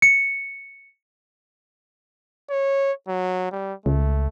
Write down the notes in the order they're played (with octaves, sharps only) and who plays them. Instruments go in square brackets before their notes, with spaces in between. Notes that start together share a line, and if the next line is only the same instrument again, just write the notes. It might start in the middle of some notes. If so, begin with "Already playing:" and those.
[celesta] C#7
[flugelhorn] C#5
F#3
G3
[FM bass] C#2 [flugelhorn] A3